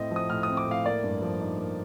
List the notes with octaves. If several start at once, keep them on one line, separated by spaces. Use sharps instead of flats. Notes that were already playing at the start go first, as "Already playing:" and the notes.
Already playing: A2 C4 D#5
F3 D#6
A2 F6
D#6
C4
D6
A2 F5
A#3 D5
G2
F3
D#4
A#3